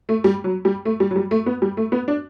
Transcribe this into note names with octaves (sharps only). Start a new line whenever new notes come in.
A3
G3
F#3
G3
A3
G3
F#3
G3
A3
B3
G3
A3
B3
D4